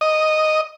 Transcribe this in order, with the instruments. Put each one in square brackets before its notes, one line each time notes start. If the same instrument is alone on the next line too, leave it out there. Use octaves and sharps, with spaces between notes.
[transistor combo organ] D#5